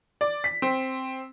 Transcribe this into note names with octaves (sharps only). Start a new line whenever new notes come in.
D5
B6
C4